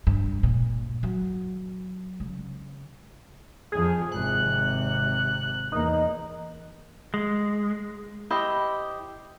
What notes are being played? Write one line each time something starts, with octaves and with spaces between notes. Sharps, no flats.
G2
A#2
F#3
C#3
F2 F3 G#4
G#1 C3 F#6
E2 A#3 D#4
G#3
E4 G4 C5 D#5